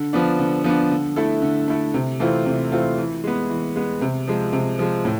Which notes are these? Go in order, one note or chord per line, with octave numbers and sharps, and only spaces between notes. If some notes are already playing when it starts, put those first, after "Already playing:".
Already playing: D3
F3 B3 D4
D3
F3 B3 D4
D3
A3 E4 A4
D3
A3 E4 A4
C3
E3 A3 C4 F4
C3
E3 A3 C4 F4
E3
G#3 B3
E3
G#3 B3
C3
F3 G#3
C3
F3 G#3
A2